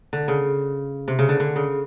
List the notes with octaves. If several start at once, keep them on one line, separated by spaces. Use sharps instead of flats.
D3
C#3
C3
C#3
D3
D3
C#3